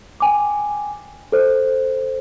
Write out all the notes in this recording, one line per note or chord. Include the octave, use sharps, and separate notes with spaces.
G5 G#5 D6
A4 C5